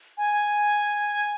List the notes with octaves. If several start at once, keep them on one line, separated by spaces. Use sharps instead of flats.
G#5